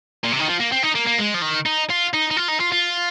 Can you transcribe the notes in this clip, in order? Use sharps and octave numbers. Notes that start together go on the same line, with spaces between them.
A#2
C3
D#3
F3
A#3
C4
D#4
A#3
A#3
G#3
F3
D#3
D#4
F4
D#4
D#4
F4
D#4
F4
F4